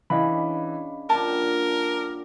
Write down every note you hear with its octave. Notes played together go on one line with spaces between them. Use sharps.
C#3 E3 D4 D#5 F5 B5
A#2 D3 G3 A#4 A5